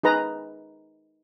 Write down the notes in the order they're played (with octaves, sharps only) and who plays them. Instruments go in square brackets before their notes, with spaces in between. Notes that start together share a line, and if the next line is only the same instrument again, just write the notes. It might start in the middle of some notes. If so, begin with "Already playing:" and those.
[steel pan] D#4 G#4 B4 A#5